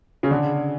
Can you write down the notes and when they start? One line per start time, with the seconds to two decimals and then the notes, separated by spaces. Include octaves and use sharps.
0.23 C#3
0.31 D3